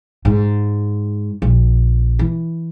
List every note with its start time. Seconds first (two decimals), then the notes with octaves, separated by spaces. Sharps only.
0.25 G#2
1.42 A#1
2.19 E3